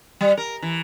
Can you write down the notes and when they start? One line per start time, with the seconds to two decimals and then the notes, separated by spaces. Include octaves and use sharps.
0.21 G3
0.37 A#4
0.62 E3